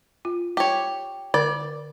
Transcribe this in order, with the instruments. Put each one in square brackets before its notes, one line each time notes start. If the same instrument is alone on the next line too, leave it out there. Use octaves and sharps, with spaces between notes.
[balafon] F4
[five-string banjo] G4 C#5
[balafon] D3 A#4 [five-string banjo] D5